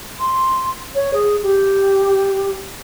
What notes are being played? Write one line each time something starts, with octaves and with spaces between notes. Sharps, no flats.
C6
C#5
G#4
G4